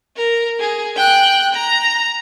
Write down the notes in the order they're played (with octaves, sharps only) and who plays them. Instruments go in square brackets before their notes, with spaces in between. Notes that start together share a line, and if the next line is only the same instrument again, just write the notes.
[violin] A#4
G#4
G5 F#6
A#5